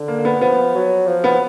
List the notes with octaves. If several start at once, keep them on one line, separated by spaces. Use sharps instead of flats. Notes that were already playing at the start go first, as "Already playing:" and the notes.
Already playing: D3
A#3
A#3
B3
F3 B3
F#3
F3
B3